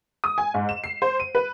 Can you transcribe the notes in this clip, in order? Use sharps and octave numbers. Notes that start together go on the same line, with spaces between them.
D#6
G#5
G#2
E7
C7
C5
D#7
B4